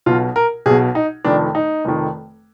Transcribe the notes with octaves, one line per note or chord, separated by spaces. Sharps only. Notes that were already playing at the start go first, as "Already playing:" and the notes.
B1 B2 F4
A#4
B1 B2 G#4
D#4
F1 F2 D#3 D4
D#4
F1 F2 D#3